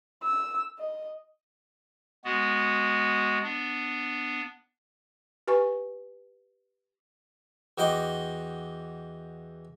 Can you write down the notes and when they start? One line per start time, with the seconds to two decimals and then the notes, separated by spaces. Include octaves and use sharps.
0.23 E6
0.78 D#5
2.25 G#3 B3 F#4
3.43 B3 D4
5.48 G4 B4 G#5 C#6
7.78 E2 F#4 D#5 G5 C6 D6